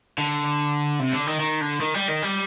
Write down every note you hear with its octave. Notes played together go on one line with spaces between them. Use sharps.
D3
C3
D3
D#3
D#3
D3
D#3
G3
D#3
G3